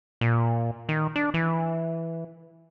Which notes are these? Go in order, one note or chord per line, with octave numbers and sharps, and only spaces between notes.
A#2
D#3
D4
E3